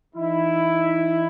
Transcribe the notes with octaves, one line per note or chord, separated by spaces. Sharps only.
E3 D#4 E4